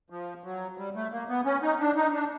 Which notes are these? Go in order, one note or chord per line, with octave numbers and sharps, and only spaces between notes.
F3
F#3
G3
A3
A#3
B3
C#4
D#4
D4
D#4
D4